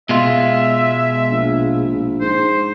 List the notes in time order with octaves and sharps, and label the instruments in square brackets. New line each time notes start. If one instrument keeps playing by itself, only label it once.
[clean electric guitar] B2 G#3 F4 [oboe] E5
[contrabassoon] A#1
[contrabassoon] G#2 [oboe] C5